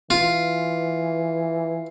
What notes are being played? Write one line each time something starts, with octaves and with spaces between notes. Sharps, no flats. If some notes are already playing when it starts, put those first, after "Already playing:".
E3 F4